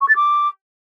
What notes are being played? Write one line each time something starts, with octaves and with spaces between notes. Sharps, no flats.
C#6
A6
D6